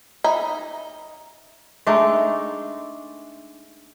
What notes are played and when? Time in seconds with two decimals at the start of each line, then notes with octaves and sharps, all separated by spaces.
0.24 D#4 D#5 E5 B5
1.86 G#3 A3 D4 D#4